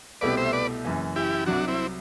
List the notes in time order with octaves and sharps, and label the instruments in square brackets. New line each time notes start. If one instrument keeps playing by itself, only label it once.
[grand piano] C2 B2 A3 E4 G4 [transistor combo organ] B4 D5
[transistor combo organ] C5 E5
B4 D5
[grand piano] F#1 F#2 E3
[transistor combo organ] E4 G4
[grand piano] C2 C3 F#3 [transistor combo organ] D4 F#4
[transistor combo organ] C4 E4